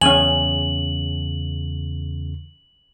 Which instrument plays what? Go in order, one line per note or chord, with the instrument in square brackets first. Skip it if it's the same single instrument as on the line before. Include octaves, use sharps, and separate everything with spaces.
[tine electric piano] E2 C#3 [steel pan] C#4 G#5 [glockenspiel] F#7